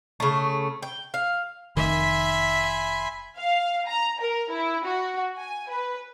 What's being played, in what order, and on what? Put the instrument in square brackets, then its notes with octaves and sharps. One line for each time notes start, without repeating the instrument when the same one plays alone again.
[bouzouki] C#3 A3
G5
F5
[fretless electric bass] F1 D#3 [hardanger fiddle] E5 [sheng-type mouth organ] G#5 B5 C6
[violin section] F5
A#5
A#4
E4
F#4
G#5
B4